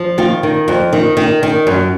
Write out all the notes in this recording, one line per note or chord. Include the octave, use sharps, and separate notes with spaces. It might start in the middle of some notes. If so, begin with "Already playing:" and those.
Already playing: F3
D#3 F4 F5
D#3
F2
D#3
D#3
D#3
F#2